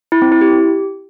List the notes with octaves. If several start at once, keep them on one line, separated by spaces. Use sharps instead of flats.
E4
C4
E4
G4